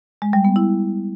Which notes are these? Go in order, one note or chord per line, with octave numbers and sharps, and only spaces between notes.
G#3
G3
B3
E4